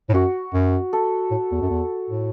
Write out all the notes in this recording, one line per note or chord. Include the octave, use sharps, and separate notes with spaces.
A2
F#2 F#4
F#2
A4
A2
E2
F#2
E2
A2